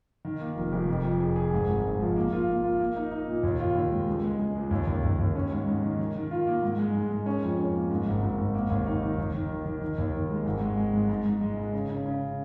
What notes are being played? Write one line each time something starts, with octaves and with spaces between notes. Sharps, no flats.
D#3
A#3
F1
F1
F2
F2
G#4
G#4
G#1
G#1
G#2
F3
A#3
F4
A#3
F4
A#3
D#4
D#4
A#2
D#2
F4
D#2
G#3
C#2
G#3
G#3
C#2
D#2
D#2
D#2
D#2
C#4
G#2
G#2
D#3
D#3
D#3
F4
A#3
G#2
G#3
G#2
G#3
C#4
F2
C#4
A#3
G#2
G#1
G#1
G#1
A#3
D#2
D#4
D#3
D#2
D#3
D#3
D#3
D#3
D#2
D#3
G#3
G#1
G#3
G#3
G#2
G#2
G#2
G#3
G#2
C#3
C#3
C#3